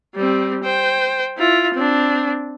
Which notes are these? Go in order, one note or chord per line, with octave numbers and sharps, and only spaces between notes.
G3 C4
C5 G5
E4 F4
C4 D4